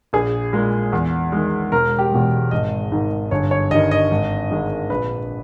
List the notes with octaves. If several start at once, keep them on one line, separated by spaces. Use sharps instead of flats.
A#1 G#4
A#2 G#3
E2
D#3 G#3
E1 A#4
G4
E2 B2 G#3
G#1 D#5
G#2 D#3
G1 C#5
C#5
G2 D#3 D#5
D#5
G#1
G#2 D#3 G#3
A#1 B4